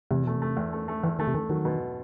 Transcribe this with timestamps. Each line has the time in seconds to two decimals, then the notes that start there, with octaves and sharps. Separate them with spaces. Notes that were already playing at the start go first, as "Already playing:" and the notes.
0.11 E2 C3
0.24 B2 A3
0.36 C3
0.42 A3
0.57 E2
0.73 A3
0.88 A3
1.03 E2 E3
1.19 D#3 A3
1.27 C3
1.34 D#3 A3
1.50 D#3 F#3
1.65 B2